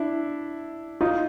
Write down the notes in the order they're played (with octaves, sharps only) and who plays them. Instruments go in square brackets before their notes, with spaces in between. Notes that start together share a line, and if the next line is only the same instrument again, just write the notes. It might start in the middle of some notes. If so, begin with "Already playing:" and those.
Already playing: [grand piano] D4 E4
D#4 F4